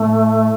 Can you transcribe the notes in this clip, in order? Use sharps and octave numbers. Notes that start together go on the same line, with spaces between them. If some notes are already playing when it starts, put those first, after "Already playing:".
Already playing: A2 A3